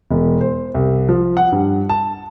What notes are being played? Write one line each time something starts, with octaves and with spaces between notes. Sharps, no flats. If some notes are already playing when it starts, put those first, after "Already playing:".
E1
C5
C2
F3
F#5
G2
A5